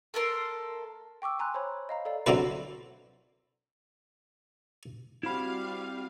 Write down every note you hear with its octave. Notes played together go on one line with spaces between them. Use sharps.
A3 A4 A#4 C6
G5 C#6 D6 E6
G#5 A#5 C6 F#6
C5 C#5 B5
D#5 F5 A#5
A4 D5 F5
D3 F#3 C4 E4 B4
G3 C4 E4 F#4 F5 B5